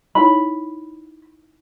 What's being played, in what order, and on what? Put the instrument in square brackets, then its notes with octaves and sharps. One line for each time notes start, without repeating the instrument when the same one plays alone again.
[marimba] D#4 E4 C#5 [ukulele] B5